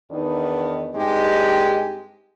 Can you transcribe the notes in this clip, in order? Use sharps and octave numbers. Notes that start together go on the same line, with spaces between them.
E2 D#3 B3 D4 D#4 B4
G2 G#3 C4 D#4 G4